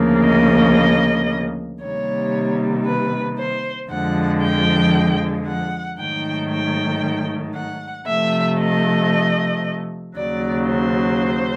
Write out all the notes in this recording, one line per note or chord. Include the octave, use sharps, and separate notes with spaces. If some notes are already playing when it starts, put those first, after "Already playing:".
Already playing: D2 C#3 F3 A#3
D#5
C3 D#3 G3 A#3 C#5
B4
C5
F2 D3 F3 G#3 F#5
G5
F#5
G#2 D#3 F#3 A3 G5
G5
F#5
C3 F3 A3 E5
D#5
D#2 C#3 F#3 D5
C5